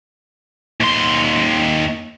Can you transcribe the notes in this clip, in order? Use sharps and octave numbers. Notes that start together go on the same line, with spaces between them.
D#2 C6